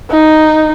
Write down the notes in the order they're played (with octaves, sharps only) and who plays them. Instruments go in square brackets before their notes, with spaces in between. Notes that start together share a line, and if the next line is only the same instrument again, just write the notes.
[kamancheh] D#4